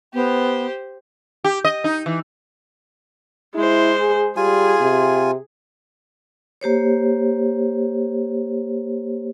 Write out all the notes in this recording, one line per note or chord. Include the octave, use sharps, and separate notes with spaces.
B3 G4 C5
G4
D#5
D#4
E3
G#3 E4 C5
G#4
G3 F4 G#4 G#5
C3
A#3 G4 C5 C#5